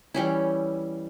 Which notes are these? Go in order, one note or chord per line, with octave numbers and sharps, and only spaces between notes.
E3 G3 C#4 E4